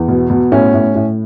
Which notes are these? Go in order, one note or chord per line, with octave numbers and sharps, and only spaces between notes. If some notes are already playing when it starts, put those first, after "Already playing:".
Already playing: E2
B2
B2
A2 C#4
A2
A2